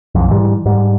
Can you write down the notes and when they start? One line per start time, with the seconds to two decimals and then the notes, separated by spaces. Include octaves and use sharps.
0.15 B1 F2
0.28 G#2 E3 G3
0.66 G#2 G3